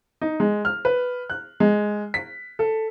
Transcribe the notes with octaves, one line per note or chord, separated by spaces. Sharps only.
D#4
G#3
F6
B4
F#6
G#3
B6
A4